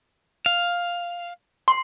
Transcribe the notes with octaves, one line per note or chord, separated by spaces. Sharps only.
F5
C6